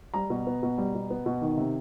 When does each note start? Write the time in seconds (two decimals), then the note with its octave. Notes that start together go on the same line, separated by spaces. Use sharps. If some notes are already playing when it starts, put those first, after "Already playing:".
0.14 G3 A#5
0.30 B2
0.47 B3
0.63 B2
0.78 G3
0.95 B2
1.10 B3
1.26 B2
1.41 D#3
1.57 C3